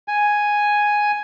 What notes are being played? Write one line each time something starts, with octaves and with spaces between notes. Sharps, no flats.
G#5